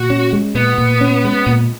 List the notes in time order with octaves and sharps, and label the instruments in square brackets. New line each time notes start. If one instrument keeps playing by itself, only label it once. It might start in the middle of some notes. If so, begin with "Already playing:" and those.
Already playing: [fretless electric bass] A#2 [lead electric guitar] F#4
[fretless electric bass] C#4
G#3
[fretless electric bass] A#2 [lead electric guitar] B3
[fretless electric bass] A#2
C#4
G#3
A#2